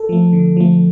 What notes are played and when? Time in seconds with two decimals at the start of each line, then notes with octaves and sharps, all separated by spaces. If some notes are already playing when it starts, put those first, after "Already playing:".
Already playing: A4
0.09 F3 A3
0.33 D3
0.57 F3 A3